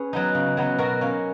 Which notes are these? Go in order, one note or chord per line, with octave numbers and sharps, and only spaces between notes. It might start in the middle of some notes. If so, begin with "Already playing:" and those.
Already playing: C#4 G#4 B4
F#3 B3 D#4
C#3
F#3 B3 D#4
B2 F#4 A#4
A#3 C#4